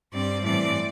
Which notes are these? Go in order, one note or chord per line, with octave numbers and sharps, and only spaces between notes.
G2 G3 C4 D5
A2 E3 G3 C4 D5